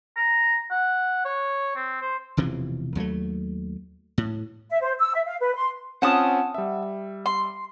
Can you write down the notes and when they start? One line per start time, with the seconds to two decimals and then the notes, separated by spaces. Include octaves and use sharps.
0.17 A#5
0.71 F#5
1.25 C#5
1.76 C4
2.01 C5
2.37 E1 C3 E3 F3
2.95 D#2 F#3 G#3 A3
4.18 A2
4.70 E5
4.82 C5
4.98 E6
5.14 E5
5.26 F5
5.40 B4
5.55 C6
6.02 C4 C#4 F4 F#5 A5 D#6
6.54 G3 E5
7.26 C6